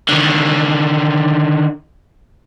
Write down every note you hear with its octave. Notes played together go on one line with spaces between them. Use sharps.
D3 D#3